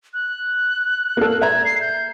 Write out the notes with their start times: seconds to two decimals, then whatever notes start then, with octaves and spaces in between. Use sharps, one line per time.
0.14 F#6
1.17 A#3 A4
1.41 E5 A#5 G#6
1.65 C7
1.81 G6